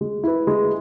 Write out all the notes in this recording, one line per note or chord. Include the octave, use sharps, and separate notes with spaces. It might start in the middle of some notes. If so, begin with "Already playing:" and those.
G#3
E4 B4
G#3